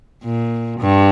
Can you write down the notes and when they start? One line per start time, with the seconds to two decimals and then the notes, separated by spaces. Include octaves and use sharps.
0.23 A#2
0.80 G2